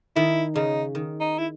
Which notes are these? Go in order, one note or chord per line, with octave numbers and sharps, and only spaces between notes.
D#3 E4
C#3 D#4
D#3
D#4
E4